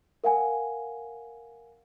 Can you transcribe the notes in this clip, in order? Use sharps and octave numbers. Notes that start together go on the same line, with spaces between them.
A#4 F5 F#5 G#5